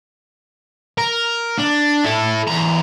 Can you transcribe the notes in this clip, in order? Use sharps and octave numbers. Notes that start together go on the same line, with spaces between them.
A#4
D4
E4 A4
E2 A#5